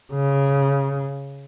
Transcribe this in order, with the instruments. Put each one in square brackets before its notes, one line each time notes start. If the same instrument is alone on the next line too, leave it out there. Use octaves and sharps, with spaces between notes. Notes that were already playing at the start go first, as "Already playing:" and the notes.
[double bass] C#3